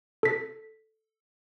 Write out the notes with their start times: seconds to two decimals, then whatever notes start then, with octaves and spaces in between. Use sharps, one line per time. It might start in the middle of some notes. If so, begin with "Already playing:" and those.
0.23 A4 B6